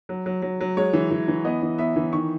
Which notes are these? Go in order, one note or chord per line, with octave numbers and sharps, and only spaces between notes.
F#3
F#3
F#3
F#3
G#3 C#5
E3
E3
E3
B3 D#5
E3
B3 E5
E3
D#3 C#6